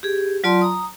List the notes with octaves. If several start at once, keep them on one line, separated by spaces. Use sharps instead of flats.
G4 G#4
F#3 F4 D5 A5 C6
A#5 D#6